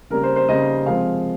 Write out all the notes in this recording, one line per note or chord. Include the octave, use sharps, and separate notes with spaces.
C#3 G3 A#3 A#4
C5
C5
C#3 G3 A#3 D#5
C3 F3 G#3 C4 F5